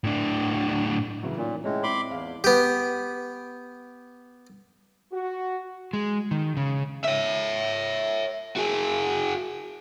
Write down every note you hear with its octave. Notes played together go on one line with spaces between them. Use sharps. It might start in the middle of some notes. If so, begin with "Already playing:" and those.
A2 D4
C#3 E3 F#3
A#2 D#3 C#4
A2 G#3 C#4 C#5
C4 E4 D5 B5 C6 D6
E2 F5
B3 G4
F#4
G#3
D#3
C#3
C#5 E5
F#4 G#4